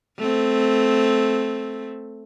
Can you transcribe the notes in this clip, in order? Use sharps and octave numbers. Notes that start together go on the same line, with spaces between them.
A3 C4